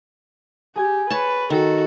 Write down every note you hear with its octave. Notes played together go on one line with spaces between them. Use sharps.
G4 G#4 G#5 G#6
B4 C#5 A5
D#3 F#4 A4